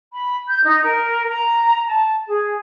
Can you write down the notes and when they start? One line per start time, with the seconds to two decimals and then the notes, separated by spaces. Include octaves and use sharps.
0.13 B5
0.48 G6
0.65 D#4
0.84 A#4
1.29 A#5
1.88 A5
2.26 G#4